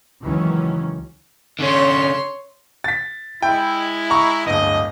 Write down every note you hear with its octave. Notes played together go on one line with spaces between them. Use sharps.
C#2 D#3 E3 F#3 C#4
D3 C#4 C#5 C6
A6 B6
G#3 E4 G5
A#5 C#6
D1 G1 D#5